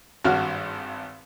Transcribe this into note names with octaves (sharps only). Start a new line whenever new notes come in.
G#1 G2 F#4 F6